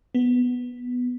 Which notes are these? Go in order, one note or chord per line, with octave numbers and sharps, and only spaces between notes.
B3